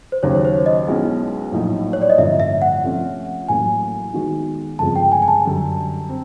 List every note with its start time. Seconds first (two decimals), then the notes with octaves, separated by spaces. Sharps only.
0.12 C5
0.23 D#2 C#3 F#3 C#5
0.35 C#5
0.45 C5
0.66 D#5
0.88 B1 B2 G#3 C#4 E4
1.52 A#1 A2 F#3 A#3 D#4
1.93 C#5
2.02 D5
2.10 D#5
2.18 A1 G2 D3 F3 A#3 E5
2.40 E5
2.62 F#5
2.84 C3 F3 A3 C#4 F4
3.49 A1 A2 F#3 A#3 G#5
4.14 D#3 G#3 B3 D#4 F#4
4.79 G1 F2 C#3 F3 G#3 A5
4.96 G5
5.12 G#5
5.22 G#5
5.28 A5
5.45 F#2 D3 G3
6.09 C4